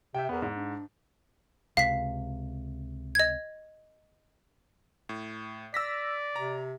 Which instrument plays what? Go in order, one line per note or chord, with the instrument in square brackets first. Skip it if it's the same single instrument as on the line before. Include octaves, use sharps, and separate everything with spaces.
[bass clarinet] C3 [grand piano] E5 G5
[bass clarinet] E2 [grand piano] B3 A#4
[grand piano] G#2
[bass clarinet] D4
[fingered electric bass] C#2 C3 [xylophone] F5 B6
[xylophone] D#5 G#6
[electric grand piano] A2
[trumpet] D5 [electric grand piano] E6 A#6 B6
[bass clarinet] C3 [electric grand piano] A#5